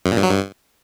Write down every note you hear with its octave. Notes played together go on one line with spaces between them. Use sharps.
F#2
A#2
G2
F#3
G2